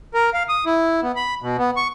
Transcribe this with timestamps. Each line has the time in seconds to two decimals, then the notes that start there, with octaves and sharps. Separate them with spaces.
0.14 A#4
0.33 F5
0.49 D#6
0.66 E4
1.03 B3
1.16 B5
1.42 B2
1.58 B3
1.77 C#6